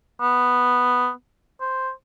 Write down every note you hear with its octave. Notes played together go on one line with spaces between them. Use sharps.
B3
C5